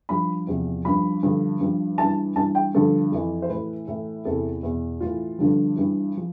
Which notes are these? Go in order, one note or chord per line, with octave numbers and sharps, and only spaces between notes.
G2 F3 B5
E2 C3 F3
G2 F3 B5
G2 D3 F3
G2 F3
G2 E3 A5
G2 E3 A5
G5
G2 D3 F3 A4
F2 E3
C5
A2 E3 B4
A2 E3
E2 C3 E3 A4
E2 B2
A2 E3 F4
G2 D3 F3
G2 E3
F3